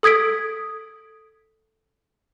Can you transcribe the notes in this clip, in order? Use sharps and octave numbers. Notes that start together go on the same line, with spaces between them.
A4 D#6 G#6 B6 D7